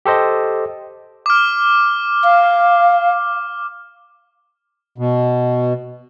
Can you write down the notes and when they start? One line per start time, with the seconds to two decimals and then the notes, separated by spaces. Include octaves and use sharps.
0.06 G4 A4 C5 D#5
1.26 D6 F6
2.24 F5
4.98 B2